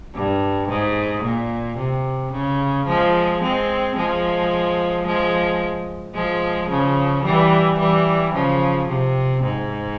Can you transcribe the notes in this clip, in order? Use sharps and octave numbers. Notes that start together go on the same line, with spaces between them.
G2
G#2
A#2
C3
C#3
F3 G#3
G#3 C4
F3 G#3
F3 G#3
F3 G#3
C#3 F3
E3 G3
E3 G3
C#3 F3
C3
G#2